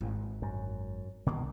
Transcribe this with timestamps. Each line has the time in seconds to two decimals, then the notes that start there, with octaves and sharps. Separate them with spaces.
0.01 G#1
0.42 F#2
1.26 F#1 C2 B2 D#3 A#3